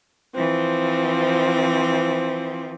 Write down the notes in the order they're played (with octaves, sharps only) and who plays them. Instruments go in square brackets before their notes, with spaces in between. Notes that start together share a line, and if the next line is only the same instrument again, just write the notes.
[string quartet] E3 F3 C4